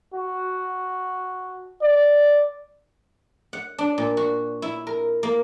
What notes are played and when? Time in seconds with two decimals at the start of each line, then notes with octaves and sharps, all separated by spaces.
0.14 F#4
1.82 D5
3.53 F#5
3.78 D4
3.98 A#2
4.17 F#4
4.62 E4
4.87 A#4
5.23 A#3